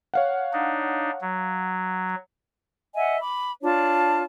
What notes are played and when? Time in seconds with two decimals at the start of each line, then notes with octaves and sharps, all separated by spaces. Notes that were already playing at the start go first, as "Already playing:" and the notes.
0.14 C#5 F5 F#5
0.53 D4 D#4
1.21 F#3
2.96 D#5 E5 F#5 G#5
3.20 B5 D6
3.62 D4 F4 C#5 A5